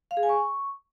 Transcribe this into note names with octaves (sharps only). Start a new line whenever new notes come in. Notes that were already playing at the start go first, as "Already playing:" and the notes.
F5
G#4
G#5
C#6